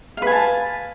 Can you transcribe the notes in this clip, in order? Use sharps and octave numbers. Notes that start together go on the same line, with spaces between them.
B4 F5 G#5 A5